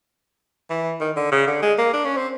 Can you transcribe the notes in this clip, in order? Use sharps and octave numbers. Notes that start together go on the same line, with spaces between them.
E3
D#3
D3
C#3
D3
G#3
A#3
D4
C#4
C4